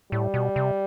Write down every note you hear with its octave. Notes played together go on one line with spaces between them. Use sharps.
A2 G3
B2
C3